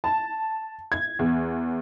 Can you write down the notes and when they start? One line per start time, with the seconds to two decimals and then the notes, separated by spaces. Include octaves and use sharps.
0.04 A5
0.92 G#6
1.19 E2